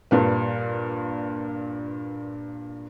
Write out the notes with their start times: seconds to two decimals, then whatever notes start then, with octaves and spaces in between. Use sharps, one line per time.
0.11 G2 A#2 B4